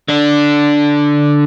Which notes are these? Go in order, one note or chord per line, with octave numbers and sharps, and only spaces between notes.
D3 D4